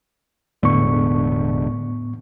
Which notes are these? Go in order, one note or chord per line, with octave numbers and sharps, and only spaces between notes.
E1 A2 D3 B3 C#6